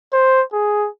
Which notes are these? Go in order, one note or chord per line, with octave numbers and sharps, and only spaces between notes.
C5
G#4